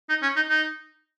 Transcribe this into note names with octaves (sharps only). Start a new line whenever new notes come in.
D#4
C#4
D#4
D#4